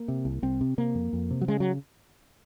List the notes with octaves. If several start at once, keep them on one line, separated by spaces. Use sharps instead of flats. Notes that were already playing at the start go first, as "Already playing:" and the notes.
Already playing: A#3
C3
C2
C2 C4
C3
C3 A#3
F2
F2
C3
F#3
C#3 G#3
F#3